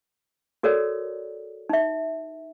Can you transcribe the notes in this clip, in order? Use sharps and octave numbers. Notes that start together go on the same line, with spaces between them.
F#4 A4 A#4 C#5 D5
D#4 E5